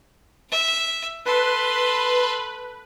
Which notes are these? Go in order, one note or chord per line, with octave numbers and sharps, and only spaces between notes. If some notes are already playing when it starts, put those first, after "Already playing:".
E5
A4 B4 C6